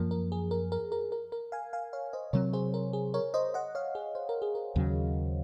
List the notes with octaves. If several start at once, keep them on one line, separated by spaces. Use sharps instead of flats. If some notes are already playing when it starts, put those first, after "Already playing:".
Already playing: F#2 F3 A#3 A#4
A#4
G#4
A#4
A#4
A#4
A#4
A#4
F5 G#5
F5 G#5
C#5 F5
C5 D#5
C3 F#3 C4 A#4 C#5
G#4 C5
A#4
G#4
A#4 C#5
C5 D#5
D#5 F#5
C#5 F5
G#4
C5
A#4
G#4
A#4
D#2 C#3 F#3